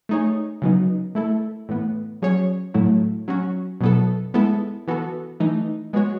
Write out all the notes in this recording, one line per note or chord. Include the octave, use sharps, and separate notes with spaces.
A3 D#4 G#4 C#5
C#3 F#3 B3 D#4
A3 E4 A4
A2 E3 B3
F#3 C#4 G#4 C#5
A2 F#3 A3 E4
F#3 C#4 F#4
B2 F#3 B3 E4 A4
G#3 B3 E4 A4
E3 B3 F#4 A4
E3 A3 D#4
G#3 B3 F#4 C#5